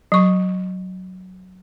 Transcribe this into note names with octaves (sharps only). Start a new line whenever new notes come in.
F#3 C#6